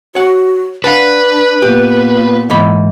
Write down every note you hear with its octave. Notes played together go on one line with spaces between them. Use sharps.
F#4 C#5 F#5
D4 B4 F5 F#5 A5
A#2 B3 G4
G#2 E3 B5